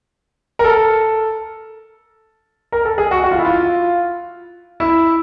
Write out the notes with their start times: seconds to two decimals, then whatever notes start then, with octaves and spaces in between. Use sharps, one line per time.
0.59 A#4
0.64 A4
2.72 A#4
2.85 A4
2.98 G#4
3.11 F#4
3.24 F#4
3.31 F4
3.39 E4
3.45 F4
4.80 E4